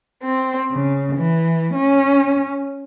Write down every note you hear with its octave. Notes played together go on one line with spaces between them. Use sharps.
C4
C#3
E3
C#4